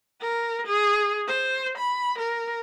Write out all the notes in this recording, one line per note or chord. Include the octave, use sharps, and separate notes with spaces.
A#4
G#4
C5
B5
A#4